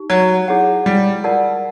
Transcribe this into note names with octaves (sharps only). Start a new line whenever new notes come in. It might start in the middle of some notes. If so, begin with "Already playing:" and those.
Already playing: D#4 G4
F#3
E4 G#4 C#5 F#5
G3
F4 A#4 D5 F#5 A5